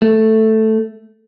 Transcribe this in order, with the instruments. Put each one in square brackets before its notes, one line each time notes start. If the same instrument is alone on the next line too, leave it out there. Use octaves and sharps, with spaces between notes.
[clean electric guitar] A3